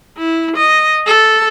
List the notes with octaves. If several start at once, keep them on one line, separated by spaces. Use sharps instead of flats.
E4
D#5
A4